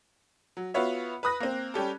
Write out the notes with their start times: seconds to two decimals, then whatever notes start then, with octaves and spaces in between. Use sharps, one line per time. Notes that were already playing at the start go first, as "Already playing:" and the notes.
0.57 F#3
0.74 B3 F4 F#4 B4 C#5 E5
1.23 B4 B5 D#6 F#6 A#6
1.40 A#3 C4
1.74 G3 C#4 G4 A4